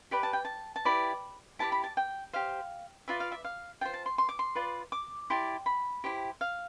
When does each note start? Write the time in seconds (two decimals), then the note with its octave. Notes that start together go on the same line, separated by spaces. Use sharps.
0.11 G4 B4 D5 B5
0.23 A5
0.33 G5
0.45 A5
0.76 A5
0.85 E4 G4 B4 D5 B5
1.59 E4 G4 B4 D5 A5
1.72 B5
1.84 A5
1.97 G5
2.33 G4 C5 F5
3.08 F4 B4 D5 E5
3.20 F5
3.32 E5
3.44 F5
3.81 F4 C5 G5
3.94 A5
4.06 C6
4.18 C6
4.29 D6
4.39 C6
4.55 F4 B4 D5
4.92 D6
5.30 E4 G4 D5 C6
5.66 B5
6.04 E4 G4 C5
6.41 F5